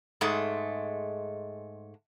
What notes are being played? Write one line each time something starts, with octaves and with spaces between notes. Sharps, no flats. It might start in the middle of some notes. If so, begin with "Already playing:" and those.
G#2 G#3 A3